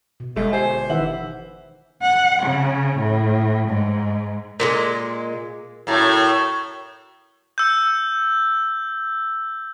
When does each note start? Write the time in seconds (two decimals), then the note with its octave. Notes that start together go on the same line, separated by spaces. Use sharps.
0.20 B2
0.36 G1 G#3 A3
0.53 G4 C5 G#5 C7
0.90 D#3 E3 E5 F#5 F#7
2.02 F#5
2.43 C#3
2.98 A2
3.68 G#2
4.60 A#2 D3 G#3
5.87 F#2 A2 A3
7.58 E6 G6